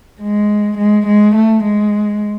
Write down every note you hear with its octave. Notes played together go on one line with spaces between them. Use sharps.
G#3
G#3
G#3
A3
G#3